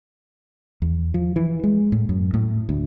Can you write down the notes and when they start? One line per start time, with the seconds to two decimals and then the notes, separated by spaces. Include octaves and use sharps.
0.82 E2
1.14 F3
1.36 E3
1.64 G#3
1.92 A2
2.09 F#2
2.34 A2
2.69 D2